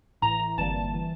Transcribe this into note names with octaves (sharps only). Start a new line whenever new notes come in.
A1 A2 E3 A#5
A#5
G1 F2 E3 G3 A#3 A5
E3